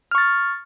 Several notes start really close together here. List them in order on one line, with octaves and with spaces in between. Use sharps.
F6 C#6 A6